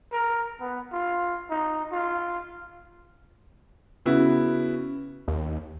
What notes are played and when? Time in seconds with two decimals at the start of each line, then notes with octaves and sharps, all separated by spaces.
0.12 A#4
0.60 B3
0.92 F4
1.50 D#4
1.92 F4
4.06 C#3 B3 E4 F#4
5.28 D#2